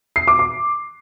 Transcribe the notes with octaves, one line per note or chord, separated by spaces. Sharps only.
C7
D6
D6